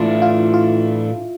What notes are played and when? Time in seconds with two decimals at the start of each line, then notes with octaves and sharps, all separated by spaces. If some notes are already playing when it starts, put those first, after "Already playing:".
Already playing: A2 E3 A3 D4 E4 F4
0.22 F4
0.54 F4